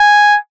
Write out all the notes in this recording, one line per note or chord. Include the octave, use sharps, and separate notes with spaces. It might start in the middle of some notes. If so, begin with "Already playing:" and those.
Already playing: G#5